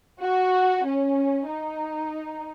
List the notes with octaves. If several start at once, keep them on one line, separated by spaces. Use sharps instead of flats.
F#4
C#4
D#4